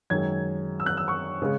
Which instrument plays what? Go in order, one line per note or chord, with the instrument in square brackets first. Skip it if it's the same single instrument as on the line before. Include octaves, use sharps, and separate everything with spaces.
[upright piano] F#2 D#3 G#3 G#6
E6
F#6
E6
C#6
C#3 G#3